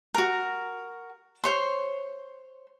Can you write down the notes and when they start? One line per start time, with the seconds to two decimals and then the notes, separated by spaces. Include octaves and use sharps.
0.14 F#4 A#4
1.44 C5 C#5 C6